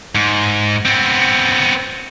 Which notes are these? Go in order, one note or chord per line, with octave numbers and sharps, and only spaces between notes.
G#2
B3 C4